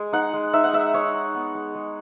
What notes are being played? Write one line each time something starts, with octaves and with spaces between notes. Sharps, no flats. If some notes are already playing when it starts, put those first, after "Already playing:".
Already playing: G#3 G#5
D#4 F#5
G#3
D#4 E5
F#5
G#3 E5
D#4 C#5
D#4
B3
G#3
G#3